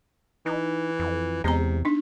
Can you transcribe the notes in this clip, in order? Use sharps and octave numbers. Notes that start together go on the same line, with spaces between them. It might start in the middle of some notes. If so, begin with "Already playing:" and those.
E3 D#4
F2
E2 C3 G#3 B3 A#5
D4 D#4